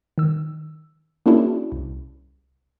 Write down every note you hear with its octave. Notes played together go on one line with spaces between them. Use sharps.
D#3 E6
A#3 C#4 D4 E4 F#4 G#4
C2